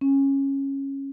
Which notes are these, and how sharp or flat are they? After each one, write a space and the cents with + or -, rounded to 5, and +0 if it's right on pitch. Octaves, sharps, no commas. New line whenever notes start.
C#4 -15